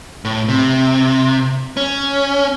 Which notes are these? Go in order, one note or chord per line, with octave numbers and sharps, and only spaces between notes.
A2
C3
C#4